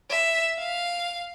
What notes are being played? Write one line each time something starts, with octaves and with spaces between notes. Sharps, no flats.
E5
F5